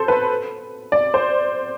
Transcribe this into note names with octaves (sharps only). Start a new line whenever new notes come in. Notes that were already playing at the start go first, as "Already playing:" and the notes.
Already playing: A4 C5
B4
D5
C5